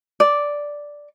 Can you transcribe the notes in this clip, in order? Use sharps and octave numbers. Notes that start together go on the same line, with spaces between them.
D5